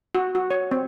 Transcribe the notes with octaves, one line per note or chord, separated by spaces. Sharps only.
F#4
F#4
C#5
C4